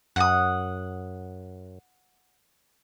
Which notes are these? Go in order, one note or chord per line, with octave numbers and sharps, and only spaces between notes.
F#2 F#5 D#6